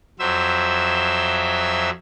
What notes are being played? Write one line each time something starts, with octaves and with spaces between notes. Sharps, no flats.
F2 F#3 C5 E5 E6